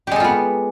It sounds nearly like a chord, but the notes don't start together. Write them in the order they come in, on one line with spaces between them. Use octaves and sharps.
G4 G#3 A4 F4 B3